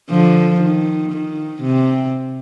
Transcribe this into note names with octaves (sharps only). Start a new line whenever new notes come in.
D3 F3
D#3
D#3
C3